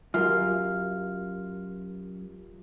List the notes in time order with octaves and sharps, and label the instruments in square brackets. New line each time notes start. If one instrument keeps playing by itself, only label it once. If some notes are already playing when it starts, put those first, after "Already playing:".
[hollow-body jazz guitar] F#2 [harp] F4 [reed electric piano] G4 A#4 E5 [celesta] F6